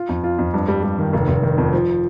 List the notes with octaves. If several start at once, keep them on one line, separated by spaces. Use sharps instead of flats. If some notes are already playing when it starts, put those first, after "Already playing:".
Already playing: F4
F2
F4
F2
G2
G3
G3
D#3
F1
F1
D#3
F2
F3